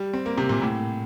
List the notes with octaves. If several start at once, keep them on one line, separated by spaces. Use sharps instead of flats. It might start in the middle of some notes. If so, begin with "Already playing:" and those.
Already playing: G3
C4
A#3
C3
A#2
A2